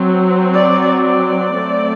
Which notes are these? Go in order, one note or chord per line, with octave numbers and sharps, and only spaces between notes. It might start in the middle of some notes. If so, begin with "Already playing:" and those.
Already playing: F#3 C4
D5
D5
F#3 A3 C4